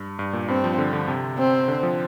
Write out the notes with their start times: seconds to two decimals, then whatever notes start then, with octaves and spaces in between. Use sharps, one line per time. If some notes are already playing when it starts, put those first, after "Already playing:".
Already playing: G2
0.19 G2
0.33 A#2
0.48 G2 C4
0.64 F3
0.78 D3
0.93 D3
1.08 C3
1.38 C4
1.68 D3
1.83 F3